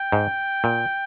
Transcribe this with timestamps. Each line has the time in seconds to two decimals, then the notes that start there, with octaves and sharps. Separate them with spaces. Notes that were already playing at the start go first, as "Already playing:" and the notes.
Already playing: G5
0.12 G#2
0.64 A#2